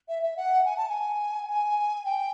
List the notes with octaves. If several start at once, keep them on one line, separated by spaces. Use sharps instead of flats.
E5
E5
F#5
G#5
A5
G#5
G#5
G5